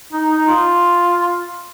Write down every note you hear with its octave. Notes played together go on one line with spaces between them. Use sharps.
D#4
D#4
F4